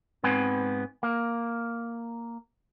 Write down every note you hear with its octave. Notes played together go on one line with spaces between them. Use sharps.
G#2 G#3 B3 C4 B4 G#5
A#3